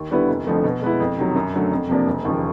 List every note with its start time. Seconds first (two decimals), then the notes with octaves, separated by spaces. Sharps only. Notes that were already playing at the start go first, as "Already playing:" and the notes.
Already playing: D#2
0.10 D3 G3 B3 E4
0.28 F1
0.46 F2 D3 F3 A3
0.64 B2
0.82 G#3 B3 E4
1.00 F2
1.17 C3 D#3 F#3
1.35 F#2
1.53 D3 F#3 A3
1.71 F2
1.89 C3 F3 A#3 D4
2.07 E1
2.25 D#2 C#3 F3